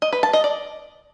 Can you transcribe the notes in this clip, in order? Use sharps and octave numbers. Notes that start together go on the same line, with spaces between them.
D#5
B4
A5
D#5
D5